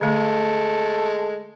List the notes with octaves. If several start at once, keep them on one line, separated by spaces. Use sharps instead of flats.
D3 G#3 A3 A4